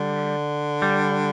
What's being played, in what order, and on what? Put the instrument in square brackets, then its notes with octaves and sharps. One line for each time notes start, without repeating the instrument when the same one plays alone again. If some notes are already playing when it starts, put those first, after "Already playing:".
Already playing: [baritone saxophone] D3 [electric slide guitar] G3
[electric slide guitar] G3